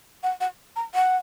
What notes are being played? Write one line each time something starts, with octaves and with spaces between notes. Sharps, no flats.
F#5
F#5
A#5
F#5